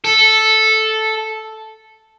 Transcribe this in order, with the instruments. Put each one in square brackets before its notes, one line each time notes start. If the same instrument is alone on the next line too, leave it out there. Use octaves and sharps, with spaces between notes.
[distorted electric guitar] A4